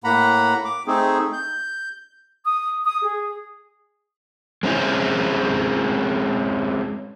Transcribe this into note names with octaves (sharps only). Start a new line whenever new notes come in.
A2 A#3 F#5 A#5 B5
D6
A3 C4 D#4 G#4
G6
D#6
D#6
G#4
G#3 C4 C#4 E4 G#4